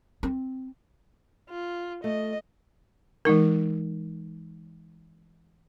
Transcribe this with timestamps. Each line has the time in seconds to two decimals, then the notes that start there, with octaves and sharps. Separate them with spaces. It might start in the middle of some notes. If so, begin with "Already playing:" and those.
0.23 C4
1.50 F4
2.04 A3 D#5
3.25 E3 G#3 D#4 A#4